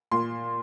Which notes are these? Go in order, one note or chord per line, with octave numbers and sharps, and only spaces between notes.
A#2 C6